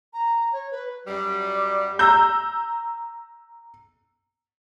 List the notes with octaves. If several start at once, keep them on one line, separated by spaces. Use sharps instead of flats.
A#5
C#5
B4
F#2 F#3 G3
D5
A#5 E6 G6